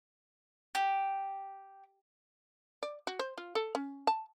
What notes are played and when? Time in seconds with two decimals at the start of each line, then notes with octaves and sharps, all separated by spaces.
0.75 G4
2.83 D5
3.07 F#4
3.19 C5
3.38 F4
3.55 A4
3.75 C#4
4.07 A5